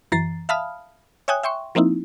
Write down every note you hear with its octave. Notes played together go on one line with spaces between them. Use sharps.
F#2 E3 A#5 A6 C7
E5 F5 A5 B5 D#6 F6
C#5 E5 G5 G#5 D#6 F#6
E5 G5 C6 C#6
F3 A#3 C4 D#4 E4